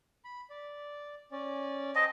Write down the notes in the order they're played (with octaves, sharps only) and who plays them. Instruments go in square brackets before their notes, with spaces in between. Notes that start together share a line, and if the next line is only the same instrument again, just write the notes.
[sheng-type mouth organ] B5
D5
C#4 D5
[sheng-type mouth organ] C5 G5 A5 [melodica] D#5